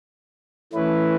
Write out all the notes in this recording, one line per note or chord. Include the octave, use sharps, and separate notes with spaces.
E3 A3 C#4 E4 B4